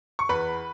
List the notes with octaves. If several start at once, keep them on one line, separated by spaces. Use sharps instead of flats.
C#6
E2 B4 B5